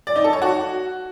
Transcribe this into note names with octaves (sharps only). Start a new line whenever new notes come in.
D5
D#4
A4
C#5
F#4